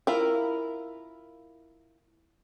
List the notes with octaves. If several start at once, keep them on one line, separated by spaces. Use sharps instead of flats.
E4 F4 A#4